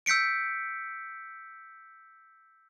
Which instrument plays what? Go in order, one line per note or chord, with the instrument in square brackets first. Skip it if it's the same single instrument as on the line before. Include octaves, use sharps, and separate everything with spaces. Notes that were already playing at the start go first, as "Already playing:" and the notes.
[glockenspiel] E6 G6 B6 C#7 D7